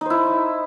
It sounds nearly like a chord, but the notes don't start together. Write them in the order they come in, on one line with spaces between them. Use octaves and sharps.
D#4 C5 E4